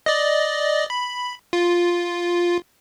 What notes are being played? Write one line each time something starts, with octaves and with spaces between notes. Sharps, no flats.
D5 D#5
B5
F4